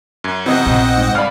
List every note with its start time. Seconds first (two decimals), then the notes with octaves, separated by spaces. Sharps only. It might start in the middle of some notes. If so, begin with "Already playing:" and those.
0.24 F#2 G#6
0.46 C3 E3 B3 C4 D#5 F#5
0.66 A#1
0.96 G#2
1.15 C2 D5 F5 B5 F6